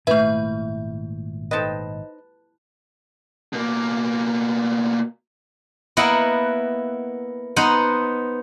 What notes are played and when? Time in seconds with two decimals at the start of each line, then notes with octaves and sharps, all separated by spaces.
0.07 G#1 A#2 A3 E4 B4 E5 F5
1.51 D#4 B4 C5 D#5 G5 A5
3.53 B2 A#3
5.97 A#3 B3 E4 D#5 F#5
7.56 B3 D#4 C5 D#5 F#5